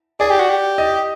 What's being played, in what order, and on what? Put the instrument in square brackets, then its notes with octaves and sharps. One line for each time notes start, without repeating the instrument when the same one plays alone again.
[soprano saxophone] G#4 [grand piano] D5
[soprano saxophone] G4
F#4
G4
[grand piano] D#5